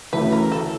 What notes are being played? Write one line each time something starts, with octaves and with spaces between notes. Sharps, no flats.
D2 C#3 E3 A3 B4
A#4
A4